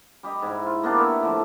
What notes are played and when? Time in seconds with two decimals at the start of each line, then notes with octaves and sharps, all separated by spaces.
0.23 G3 G4 D#5
0.42 G#2 E4
0.66 F4
0.83 A#3 B3 D4 G4
0.96 A#4 B4 C#5 E5
1.20 A2 D3 F3